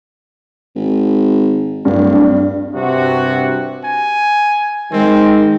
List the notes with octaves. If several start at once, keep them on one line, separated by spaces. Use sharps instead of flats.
G#1
D1 G2
G2 C3 F#4
G#5
D#3 G#3 C4